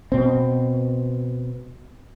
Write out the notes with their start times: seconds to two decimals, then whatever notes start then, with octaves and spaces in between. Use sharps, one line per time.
0.12 B2 C4